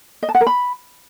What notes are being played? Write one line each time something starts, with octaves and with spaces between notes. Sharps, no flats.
D#5
A5
F#5
A#4
B5